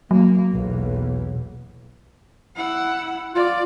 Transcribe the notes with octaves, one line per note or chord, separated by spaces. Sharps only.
F#3 A#3
B1 E2
E4 F#5
F4 D5